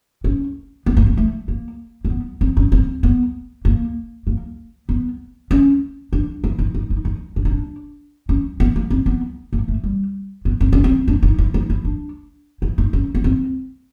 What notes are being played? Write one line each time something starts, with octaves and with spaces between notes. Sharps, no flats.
C#4
B3
A#3
B3
A3
A#3
A#3
B3
C4
C#4
C4
B3
A#3
A#3
B3
C#4
D4
E4
D#4
D#4
D#4
D#4
D4
D#4
D4
C#4
B3
A#3
C4
B3
A#3
A3
G3
B3
C4
C#4
C4
D4
D#4
E4
D#4
E4
D4
E4
D#4
C#4
B3
C4